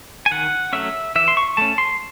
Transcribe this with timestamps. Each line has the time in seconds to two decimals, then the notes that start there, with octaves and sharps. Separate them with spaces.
0.26 G#5
0.31 D#3 F#5
0.73 F#3 A3 C#4 E5
1.16 E3 E5
1.28 C6
1.37 C#6
1.57 A3 C#4 A5
1.78 C6